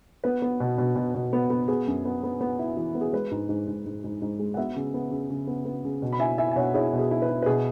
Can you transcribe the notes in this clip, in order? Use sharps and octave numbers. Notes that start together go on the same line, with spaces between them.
B3 B4
B3
B2
B2
B2
B2
B3
B3
B3 G#4
F#2
B3
B3
B3
E4
E3
B3
G#4
G#3 B4
G#2
G#2
G#2
G#2
G#2
G#2
G#3
F#5
B3 B4 E5
C#3
B3
C#3
C#3
B3
B3
C#3
B2
B5
E4 E5 G#5
E4 E5 G#5
G#5
B2 C#5 F#5
E4 G#4 C#5
B2
G#4
E4
B4
E4
B4
B2 G#4